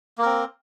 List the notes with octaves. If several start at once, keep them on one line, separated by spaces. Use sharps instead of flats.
A#3 C4 A#4